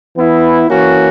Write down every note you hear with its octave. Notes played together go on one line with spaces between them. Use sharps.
E3 B3 E4
E3 A#3 C#4 F#4